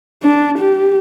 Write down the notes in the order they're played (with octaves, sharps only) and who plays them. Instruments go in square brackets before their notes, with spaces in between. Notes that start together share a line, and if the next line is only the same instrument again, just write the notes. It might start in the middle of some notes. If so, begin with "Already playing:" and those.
[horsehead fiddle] D4
G4